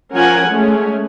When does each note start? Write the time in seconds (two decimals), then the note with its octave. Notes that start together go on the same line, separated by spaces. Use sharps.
0.15 F3 C#4 A#4 F#5 G#5
0.50 G#3 A3 C#4